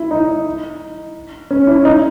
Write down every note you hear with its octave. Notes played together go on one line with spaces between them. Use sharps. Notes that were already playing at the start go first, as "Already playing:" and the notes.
Already playing: E4
D#4
C#4
E4
D#4